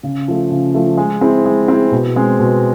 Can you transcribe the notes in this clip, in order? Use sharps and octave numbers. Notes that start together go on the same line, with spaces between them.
C#3
F3 A3
C#3
F3 A3
G#3
C4 E4 G#4
G#3
C4 E4 G#4
B2
G#3 C4
B2